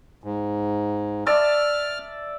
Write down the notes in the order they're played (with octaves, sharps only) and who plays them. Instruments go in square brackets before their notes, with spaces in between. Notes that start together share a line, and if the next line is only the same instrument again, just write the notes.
[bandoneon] G#2
[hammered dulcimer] D5 E5 A5 [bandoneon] F6